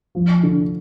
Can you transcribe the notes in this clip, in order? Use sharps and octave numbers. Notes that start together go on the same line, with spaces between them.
F3
D3